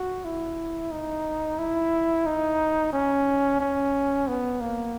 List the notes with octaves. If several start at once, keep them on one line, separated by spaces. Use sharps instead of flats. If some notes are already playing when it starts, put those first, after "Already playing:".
Already playing: F#4
E4
D#4
E4
D#4
C#4
C#4
B3
A#3